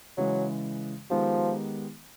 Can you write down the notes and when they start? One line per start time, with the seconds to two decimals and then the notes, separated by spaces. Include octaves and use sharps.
0.17 C#3 E3 F#3 G#3
1.10 D#3 F3 G#3 B3 D#4 G4